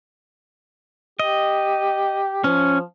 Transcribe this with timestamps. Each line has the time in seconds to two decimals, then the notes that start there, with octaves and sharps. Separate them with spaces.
1.19 G4 D#5
2.44 F3 C#4